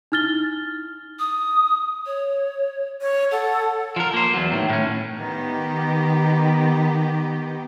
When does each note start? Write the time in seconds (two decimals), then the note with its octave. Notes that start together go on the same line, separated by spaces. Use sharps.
0.12 D#4 E4 F6 A6 G7
1.19 D#6
2.06 C#5
3.02 C#5
3.32 A4 F#5
3.96 F3 A#4
4.14 A#3 C5
4.34 E2 F#3
4.52 A2 D#3
4.69 A2 C#4
5.16 D#3 B3 G4